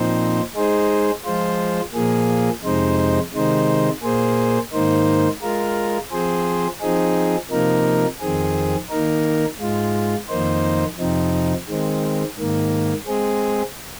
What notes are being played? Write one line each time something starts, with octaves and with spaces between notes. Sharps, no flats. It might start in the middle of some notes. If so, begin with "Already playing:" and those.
Already playing: A#2 F3 C4 D#4 C5
G#3 D#4 G#4 C5
F3 G#3 F4 C5
A#2 F3 A#3 G#4
F2 C3 G#3 D#4 C5
C3 D#3 G#3 D#4 C5
A#2 A#3 G#4 C5
G#2 D#3 A#3 D#4 C5
G#3 F4 A#4
F3 C4 G#4 C5
F3 C4 D#4 G#4
C3 F3 A#3 D#4 A#4
F2 D#3 C4 G#4
D#3 A#3 D#4 A#4
G#2 G#3 F4
F2 D#3 A#3 D#4 C5
F2 C3 F3 C4 D#4
D#3 G#3 C4
G#2 D#3 A#3
G#3 C4 G#4